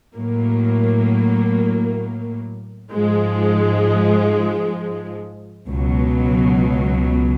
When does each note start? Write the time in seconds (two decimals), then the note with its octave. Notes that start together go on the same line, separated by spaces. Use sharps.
0.15 A2 F#3 A#3
2.92 G#2 F3 G#3
5.68 C#2 B2 F#3